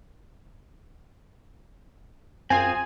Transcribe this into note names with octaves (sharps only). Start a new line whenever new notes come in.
F#2 C4 F4 G#4 G#5